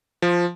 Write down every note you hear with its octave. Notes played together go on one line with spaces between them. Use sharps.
F3